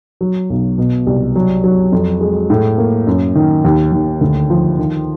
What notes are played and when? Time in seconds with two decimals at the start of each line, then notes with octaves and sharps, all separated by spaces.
0.21 F#3
0.50 B1
0.78 B2
1.07 C2
1.36 F#3
1.64 F#3
1.92 F2
2.21 G#3
2.50 A2
2.78 A#3
3.07 F#2
3.35 D#3
3.64 D#2
3.92 D#2
4.21 D2
4.50 F3
4.79 D#3